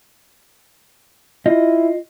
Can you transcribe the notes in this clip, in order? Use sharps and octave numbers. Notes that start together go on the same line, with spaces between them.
E4 F4 D#5